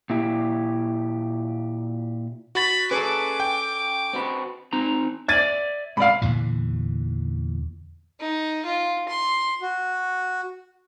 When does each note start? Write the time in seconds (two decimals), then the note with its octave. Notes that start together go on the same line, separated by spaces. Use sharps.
0.10 A#2 E4 G4
2.55 F#4 B5 A6
2.91 C#4 G#4 A4 B4 D6
3.40 G5
4.13 C4 F#4 B4
4.73 C4 D#4 A#5
5.28 D5 E5 G#6 A6 D#7
5.97 G#2 C3 D5 F5 B5
6.22 E2 A#2 D3 E3
8.20 D#4
8.65 F4
9.08 C6
9.61 F#4